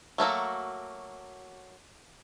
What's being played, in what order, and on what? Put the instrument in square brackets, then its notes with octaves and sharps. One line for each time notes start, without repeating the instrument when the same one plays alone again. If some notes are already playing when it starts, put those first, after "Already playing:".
[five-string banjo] F#3 A3 A#3 F#4